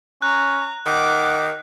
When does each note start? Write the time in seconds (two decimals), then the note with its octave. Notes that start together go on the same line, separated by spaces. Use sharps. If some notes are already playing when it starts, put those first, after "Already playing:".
0.22 C#4 A#5 F#6
0.86 D#3 F#5 D6